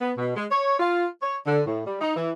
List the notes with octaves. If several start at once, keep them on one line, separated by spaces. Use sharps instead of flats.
B3
B2
G#3
C#5
F4
C#5
D3
A2
G3
D#4
E3